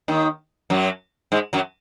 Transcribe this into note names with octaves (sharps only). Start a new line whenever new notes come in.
D#2 D#3
F#2 F#3
G#2 G#3
F#2 F#3